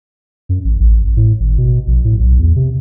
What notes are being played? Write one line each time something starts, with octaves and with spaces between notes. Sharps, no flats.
F#2
A1
A1
A2
G#1
B2
A#1
A2
B1
E2
C3